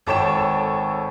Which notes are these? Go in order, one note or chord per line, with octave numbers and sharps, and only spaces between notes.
G#1 A4 C#5 G5 E7